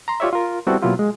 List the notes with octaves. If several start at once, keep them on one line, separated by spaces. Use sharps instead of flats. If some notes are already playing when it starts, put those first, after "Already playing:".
A#5 C6
F4 G4 C#5 D5 E5
F4 A#4
G3 B3 C4 E4 F#4 A4
B2 F#3 A#3 E4 F4 G4
G#3